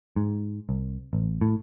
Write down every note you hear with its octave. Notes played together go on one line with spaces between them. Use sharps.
G#2
C2
A1
A2